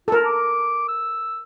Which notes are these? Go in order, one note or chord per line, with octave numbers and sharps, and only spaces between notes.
F4 A4 A#4
D6
E6